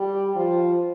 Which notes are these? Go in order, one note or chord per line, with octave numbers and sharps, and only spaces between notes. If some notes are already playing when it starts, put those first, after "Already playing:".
Already playing: G3
F3